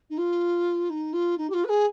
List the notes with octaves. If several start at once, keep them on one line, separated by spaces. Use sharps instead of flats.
D#4
F4
D#4
F4
D#4
G4
F4
B4
G#4